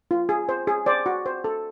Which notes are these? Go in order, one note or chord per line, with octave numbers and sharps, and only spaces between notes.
F4
G#4
C5
G#4
C5 D5
F#4
C5
A4